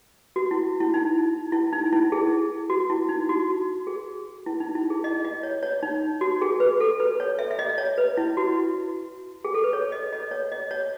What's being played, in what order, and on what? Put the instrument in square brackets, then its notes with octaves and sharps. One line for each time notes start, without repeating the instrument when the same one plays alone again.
[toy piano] F#4
E4
E4
D#4
E4
D#4
E4
G#4
F#4
E4
D#4
F#4
G#4
E4
D#4
E4
G#4
D#5
D#5
C#5
C#5
D#4
F#4
G#4
B4
A4
B4
C#5
E5
E5
D#5
C#5
B4
E4
F#4
G#4
A4
B4
C#5
D#5
D#5
C#5
D#5
C#5